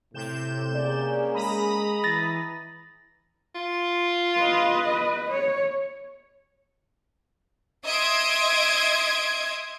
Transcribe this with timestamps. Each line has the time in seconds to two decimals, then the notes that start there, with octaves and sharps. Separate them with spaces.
0.14 A2 C3 G6 E7
0.75 A#3 C#4 G#4 D5
1.34 G#3 A#5 B5 D#6
2.04 E3 A6 A#6
3.55 F4
4.39 B4 D#5
5.30 C#5
7.83 D#5 E5 C6 D#6 G#6 D7